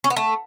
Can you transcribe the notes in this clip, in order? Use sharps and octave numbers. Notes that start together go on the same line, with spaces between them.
C#4
B3
A3